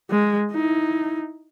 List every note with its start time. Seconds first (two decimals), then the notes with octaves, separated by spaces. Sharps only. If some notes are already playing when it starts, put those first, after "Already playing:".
0.10 G#3
0.52 D#4 E4